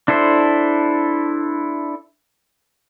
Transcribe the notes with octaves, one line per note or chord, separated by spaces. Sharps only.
D4 E4 A4 C5